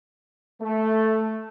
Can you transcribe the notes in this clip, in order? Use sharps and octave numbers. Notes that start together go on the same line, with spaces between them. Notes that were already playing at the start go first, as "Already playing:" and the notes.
A3